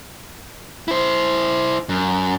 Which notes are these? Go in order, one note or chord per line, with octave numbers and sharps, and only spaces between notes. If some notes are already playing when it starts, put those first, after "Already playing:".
E4 C5
F#2